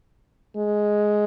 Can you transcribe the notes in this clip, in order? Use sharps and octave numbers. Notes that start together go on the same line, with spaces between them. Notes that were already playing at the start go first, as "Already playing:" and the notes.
G#3